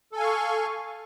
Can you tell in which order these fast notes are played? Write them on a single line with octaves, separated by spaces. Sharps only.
A4 G#5 F5 C#6